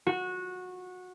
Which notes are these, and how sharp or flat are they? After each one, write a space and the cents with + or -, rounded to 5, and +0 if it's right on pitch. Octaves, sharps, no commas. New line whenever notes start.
F#4 -20